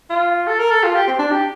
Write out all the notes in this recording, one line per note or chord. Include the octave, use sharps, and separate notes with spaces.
F4
A4
A#4
A4
F4
G4
C4
D4
G4